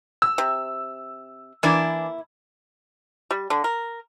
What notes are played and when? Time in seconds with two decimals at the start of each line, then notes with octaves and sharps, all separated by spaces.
0.22 E6
0.38 C3
1.63 E3 A#3 D4 E4 D5
3.31 G3
3.50 D3
3.64 A#4